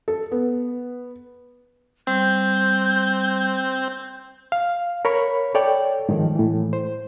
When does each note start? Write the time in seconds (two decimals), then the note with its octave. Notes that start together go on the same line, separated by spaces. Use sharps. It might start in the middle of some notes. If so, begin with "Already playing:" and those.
0.08 A4
0.32 B3
2.07 G3 C4 G6
4.52 F5
5.05 A#4 C#5 B5 C#6
5.55 A4 C#5 D5 G5
6.09 G#2 D#3 F3
6.35 A2 E3
6.73 C5